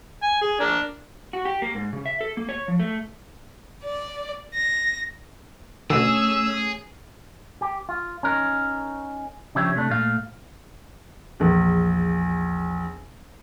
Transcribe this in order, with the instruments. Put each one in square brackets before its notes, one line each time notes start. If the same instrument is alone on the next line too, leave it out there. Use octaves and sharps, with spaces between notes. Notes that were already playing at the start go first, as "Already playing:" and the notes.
[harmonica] G#5
G#4
D4 A#4
[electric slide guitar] F#4
G4
A#3
G#2
C#3
E5
A4
A#3
C#5
F3
A3
[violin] D5
A#6
[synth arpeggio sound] B2 D3 [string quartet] A3 C#4 [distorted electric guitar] G#4 [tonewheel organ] E6
[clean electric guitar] G4
F4
C#4 D#4 A#4
C#3 F3 D4 G4 C#5 E5
C3 A3 D4
A#2 A3 F5
[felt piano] A#1 E2